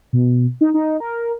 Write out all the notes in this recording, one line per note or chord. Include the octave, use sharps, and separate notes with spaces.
B2
D#4
D#4
A#4